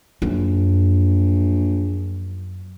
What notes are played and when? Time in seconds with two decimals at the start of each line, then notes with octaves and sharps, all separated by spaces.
0.22 A#1 F#2